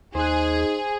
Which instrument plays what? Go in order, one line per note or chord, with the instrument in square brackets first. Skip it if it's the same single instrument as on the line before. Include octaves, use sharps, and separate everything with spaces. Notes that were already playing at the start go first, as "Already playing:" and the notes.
[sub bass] D#2 [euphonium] D#4 [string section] G#4 [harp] C5 F#6